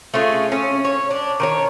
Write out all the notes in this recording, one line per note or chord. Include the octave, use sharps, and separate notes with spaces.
A3 C#4 F4 G#4
C#4
C#5
D4
D#3 C5 C#5